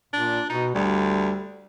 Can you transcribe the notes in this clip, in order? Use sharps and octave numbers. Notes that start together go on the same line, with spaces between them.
A#2 D4
B2 D#4
D2 G3